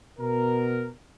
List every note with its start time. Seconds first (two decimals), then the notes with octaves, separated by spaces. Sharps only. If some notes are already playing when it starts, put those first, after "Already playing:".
0.19 B2 A#4